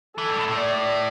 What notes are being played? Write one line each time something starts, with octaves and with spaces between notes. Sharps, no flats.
E3 A4
G2
A2
A2
D5